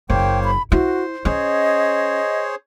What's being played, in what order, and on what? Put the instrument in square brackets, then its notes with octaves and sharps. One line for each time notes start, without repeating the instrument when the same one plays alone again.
[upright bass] F#1 [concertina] A#3 C5 C#5 [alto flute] G5
[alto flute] B5
[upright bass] E4 [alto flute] F#4 [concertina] C5
[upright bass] C#4 [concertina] G#4 C5 C#5 [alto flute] D#5